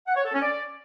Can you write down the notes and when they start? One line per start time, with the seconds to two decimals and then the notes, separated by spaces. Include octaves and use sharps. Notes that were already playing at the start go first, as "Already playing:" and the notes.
0.07 F#5
0.16 C#5
0.24 A4
0.33 C#4
0.41 D5